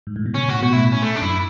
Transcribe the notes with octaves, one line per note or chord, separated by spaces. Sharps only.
G#2
A2
B2
C#3 C#4
A2 F#4
B2 F#4
A2 E4
C#4
A3
D4
F#2 E4